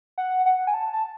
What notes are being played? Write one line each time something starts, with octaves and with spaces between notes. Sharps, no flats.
F#5
F#5
G#5
A5
A5